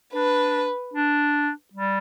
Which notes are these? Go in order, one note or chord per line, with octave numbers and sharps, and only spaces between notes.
D4 B4
D4
G3